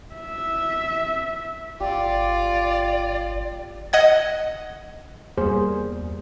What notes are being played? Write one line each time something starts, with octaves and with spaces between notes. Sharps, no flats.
E5
G1 F4 G4 D5
D#5 F#5 G#6
E2 G3 A#3 G#4 C5